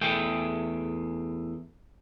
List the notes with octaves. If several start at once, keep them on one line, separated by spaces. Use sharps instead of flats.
E2 A3 G#4 G5